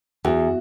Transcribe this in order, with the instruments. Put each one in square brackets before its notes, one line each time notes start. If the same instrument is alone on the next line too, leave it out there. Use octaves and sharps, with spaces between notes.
[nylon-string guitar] E2 [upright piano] F#4